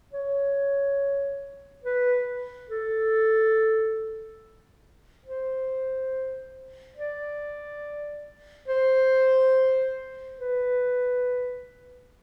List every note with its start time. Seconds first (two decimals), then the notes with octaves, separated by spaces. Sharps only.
0.13 C#5
1.84 B4
2.70 A4
5.26 C5
6.97 D5
8.68 C5
10.39 B4